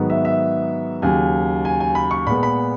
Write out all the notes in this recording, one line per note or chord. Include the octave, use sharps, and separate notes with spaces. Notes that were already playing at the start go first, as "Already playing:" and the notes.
Already playing: G#2 D#3 F#3 B3
E5
E5
D#2 C#3 F#3 G#5
G#5
G#5
B5
C#6
A#2 G#3 B3 B5
B5